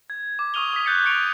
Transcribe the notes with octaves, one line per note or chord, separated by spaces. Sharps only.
G#6
D6
C#6 D#6 F6 D#7 F7 G7
D#6 B6
F#6 G6 A6 C#7
C#6 G6 C#7 D7 F7